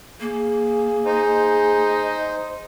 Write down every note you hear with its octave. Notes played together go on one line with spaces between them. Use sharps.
A#3 G#4
D#4 C5